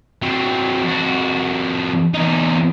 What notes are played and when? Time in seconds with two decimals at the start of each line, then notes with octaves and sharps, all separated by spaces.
0.22 F#3 C4
0.84 F2 F#4
2.14 E2 D#4